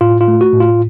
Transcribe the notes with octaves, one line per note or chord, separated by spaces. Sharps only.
A2 F4
F4
A3
F#4
A2
F4